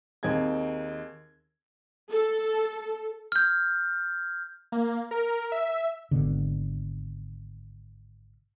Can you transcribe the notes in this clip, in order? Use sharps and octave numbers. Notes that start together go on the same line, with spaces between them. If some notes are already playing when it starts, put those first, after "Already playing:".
D#2 C4 D#4 G#4 G#6
A4
F6 G6
A#3
A#4
E5
G#1 B2 D3